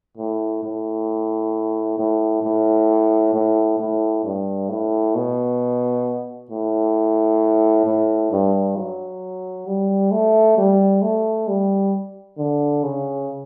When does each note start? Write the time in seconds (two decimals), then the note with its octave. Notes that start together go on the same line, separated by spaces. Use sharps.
0.18 A2
0.63 A2
1.99 A2
2.43 A2
3.34 A2
3.80 A2
4.25 G2
4.70 A2
5.15 B2
6.51 A2
7.86 A2
8.31 G2
8.77 F#3
9.67 G3
10.12 A3
10.58 G3
11.02 A3
11.48 G3
12.38 D3
12.83 C#3